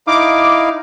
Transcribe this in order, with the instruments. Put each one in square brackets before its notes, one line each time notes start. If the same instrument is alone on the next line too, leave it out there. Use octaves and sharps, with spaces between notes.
[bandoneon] D#4 E4 F5 [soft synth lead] D6